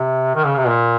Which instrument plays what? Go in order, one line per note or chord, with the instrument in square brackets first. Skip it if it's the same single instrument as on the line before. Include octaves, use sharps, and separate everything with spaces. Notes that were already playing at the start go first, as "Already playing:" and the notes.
Already playing: [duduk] C3
D#3
C#3
C3
A#2